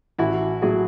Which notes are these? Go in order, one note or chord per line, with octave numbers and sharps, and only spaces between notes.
A1 E4 F#4
A2 F#3 F#4 G#4